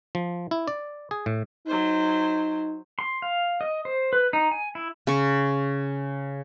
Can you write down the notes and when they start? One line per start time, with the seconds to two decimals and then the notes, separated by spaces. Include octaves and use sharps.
0.15 F3
0.51 E4
0.68 D5
1.11 G#4
1.26 A2
1.66 F#3 D#4 C5
2.99 C6
3.22 F5
3.61 D#5
3.85 C5
4.13 B4
4.33 D#4
4.51 G#5
4.75 E4
5.07 C#3 C#6